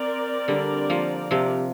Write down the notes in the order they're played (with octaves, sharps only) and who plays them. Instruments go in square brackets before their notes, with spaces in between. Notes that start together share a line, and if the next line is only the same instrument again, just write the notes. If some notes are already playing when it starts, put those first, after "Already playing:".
Already playing: [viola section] C4 A#4 D5
[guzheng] D3 G3
F3 A#3
C3 F3